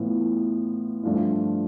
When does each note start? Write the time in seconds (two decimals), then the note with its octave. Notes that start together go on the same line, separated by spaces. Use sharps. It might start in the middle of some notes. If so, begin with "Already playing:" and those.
Already playing: A2 E3 B3 F4
1.03 G2 F3 A3 D4 F4